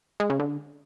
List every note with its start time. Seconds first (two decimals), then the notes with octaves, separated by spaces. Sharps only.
0.20 G#3
0.30 C#3
0.39 D3